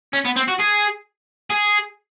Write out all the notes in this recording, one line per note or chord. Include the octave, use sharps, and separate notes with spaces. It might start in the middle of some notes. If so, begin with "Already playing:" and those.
C#4
B3
C4
F#4
G#4
G#4